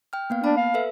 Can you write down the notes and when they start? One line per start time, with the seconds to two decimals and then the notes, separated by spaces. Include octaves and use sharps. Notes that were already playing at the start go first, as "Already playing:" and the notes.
0.13 G5 F6
0.30 A#3 B3 F5
0.44 D4 A5 B5
0.57 F5
0.74 A4 B4 E5